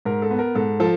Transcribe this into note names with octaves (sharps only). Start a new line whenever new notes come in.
G#2 A#4
A4
B3
A#4
G#2 A4
F3 A4